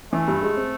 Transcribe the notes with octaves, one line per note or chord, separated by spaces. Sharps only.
E3 A3
G2
G#3
C4